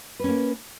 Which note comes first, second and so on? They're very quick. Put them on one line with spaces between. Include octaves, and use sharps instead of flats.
B4 C#4 A#3